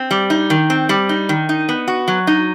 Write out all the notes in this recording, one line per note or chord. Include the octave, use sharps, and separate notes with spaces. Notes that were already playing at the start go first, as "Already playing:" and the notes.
Already playing: C4
G3
D#4
D#3
C4
G3
D#4
D#3
D#4
B3
F#4
F#3
D#4